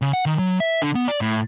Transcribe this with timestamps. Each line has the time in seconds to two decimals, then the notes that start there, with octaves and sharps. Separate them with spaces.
0.02 C#3
0.13 F#5
0.26 D#3
0.39 F#3
0.60 E5
0.82 D3
0.95 B3
1.08 D5
1.21 A2